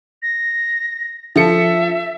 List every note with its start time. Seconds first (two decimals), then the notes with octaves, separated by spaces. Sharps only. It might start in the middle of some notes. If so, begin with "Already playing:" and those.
0.22 A#6
1.36 F3 A4 E5 C#7